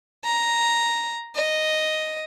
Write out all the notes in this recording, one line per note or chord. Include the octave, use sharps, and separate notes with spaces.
A#5
D#5